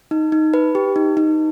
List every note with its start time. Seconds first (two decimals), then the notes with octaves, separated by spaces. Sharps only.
0.11 D#4
0.32 D#4
0.54 B4
0.75 G4
0.96 D#4
1.17 D#4